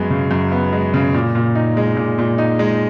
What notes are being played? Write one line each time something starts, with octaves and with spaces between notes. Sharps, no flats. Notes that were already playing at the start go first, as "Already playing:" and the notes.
Already playing: F#2 G#3 B3
C#3
F#2
B3
G#3
C#3
A#2
A#2
D#4
G#3
A#2
A#2
D#4
G#3